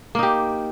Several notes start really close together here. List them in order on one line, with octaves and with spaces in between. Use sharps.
A#3 D#4 G4